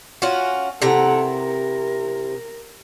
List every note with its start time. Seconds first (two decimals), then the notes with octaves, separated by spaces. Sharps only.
0.22 C#4 F4 F#4
0.82 C3 E4 A4 F#5 A#5
1.26 A#4